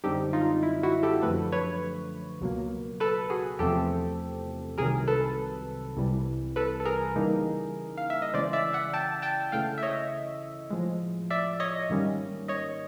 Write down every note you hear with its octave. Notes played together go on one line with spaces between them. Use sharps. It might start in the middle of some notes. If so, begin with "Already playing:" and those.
F#2 D3 G3 C4 D#4 G4 A4
D#4 F4
E4
E4 F#4
G4 A4
F#2 D3 F3 A3 A4 B4
B4 C#5
C#2 B2 F#3 A#3
A4 B4
F#4 G#4
E2 C3 F3 A3 C4 G4 A4
C2 C3 D#3 F#3 G#4 A#4
A4 B4
C2 C3 E3 G3
A4 B4
A4
G#4 A#4
C#3 E3 G3 A#3 D#4
F5
E5
D#5
C#3 E3 G#3 C#4 C5 D5
D5 E5
E5 F#5
G5 A5
G5 A5
C#3 E3 A3 F5 G5
E5
C#5 D#5
A2 F3 G#3
D5 E5
C#5 D#5
G#2 D#3 G3 A#3 C#4
C#5 D#5